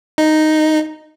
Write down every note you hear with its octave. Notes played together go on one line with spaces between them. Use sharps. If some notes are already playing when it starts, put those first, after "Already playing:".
D#4